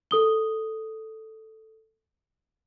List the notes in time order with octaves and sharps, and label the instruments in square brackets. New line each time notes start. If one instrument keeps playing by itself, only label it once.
[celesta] A4 D#6 G7